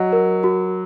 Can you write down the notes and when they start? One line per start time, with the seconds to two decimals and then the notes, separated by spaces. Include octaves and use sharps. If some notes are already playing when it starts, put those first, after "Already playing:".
Already playing: F#3 D#5
0.13 A#4
0.44 F#4